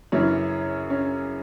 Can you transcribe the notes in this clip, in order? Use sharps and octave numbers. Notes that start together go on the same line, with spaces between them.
F#2 C#3 E3 C#4
C#4